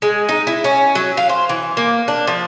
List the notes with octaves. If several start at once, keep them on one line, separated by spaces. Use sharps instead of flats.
G#3
D#4
E4
C#4
F#3
F5
C5
E3
A#3
D4
F3